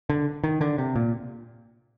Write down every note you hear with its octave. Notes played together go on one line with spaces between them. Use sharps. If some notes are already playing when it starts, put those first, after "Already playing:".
D3
D#3
D3
C3
A#2